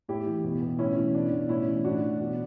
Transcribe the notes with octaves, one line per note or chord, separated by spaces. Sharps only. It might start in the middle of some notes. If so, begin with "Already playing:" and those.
A2 E4 G4
E3
B2
B2
A2 C#4 E4
E3
B2 D4
B2
A2 C#4 E4
E3
A2 D4 F#4
E3
B2